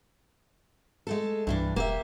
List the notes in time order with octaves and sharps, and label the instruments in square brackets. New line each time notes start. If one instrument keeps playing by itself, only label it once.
[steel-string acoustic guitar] G#3 A3 A4
[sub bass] C2 [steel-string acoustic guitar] G2 E3 D4
[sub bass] E1 [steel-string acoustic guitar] A#3 G4 E5